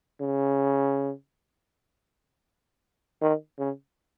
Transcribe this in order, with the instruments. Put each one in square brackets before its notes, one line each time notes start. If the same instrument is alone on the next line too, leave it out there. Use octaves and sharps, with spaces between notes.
[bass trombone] C#3
D#3
C#3